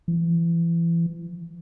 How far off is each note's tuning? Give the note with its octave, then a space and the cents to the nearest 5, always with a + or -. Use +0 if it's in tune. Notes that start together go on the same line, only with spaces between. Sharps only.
E3 +30